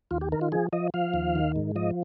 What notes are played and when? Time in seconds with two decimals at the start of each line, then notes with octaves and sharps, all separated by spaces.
0.11 D#2 F4
0.21 G4
0.32 D#3 A#4
0.41 F4
0.52 F3 G#4
0.73 F3 D#5
0.94 F3 F5
1.14 D#2
1.35 D#3
1.56 G#2
1.76 F3 D#5